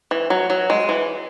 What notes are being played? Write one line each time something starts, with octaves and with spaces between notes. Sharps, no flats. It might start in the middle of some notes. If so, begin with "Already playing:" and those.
E3
F#3
F#3
G#3
E3